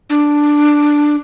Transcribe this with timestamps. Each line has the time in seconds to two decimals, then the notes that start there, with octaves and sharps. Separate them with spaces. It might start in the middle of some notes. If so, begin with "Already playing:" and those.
0.09 D4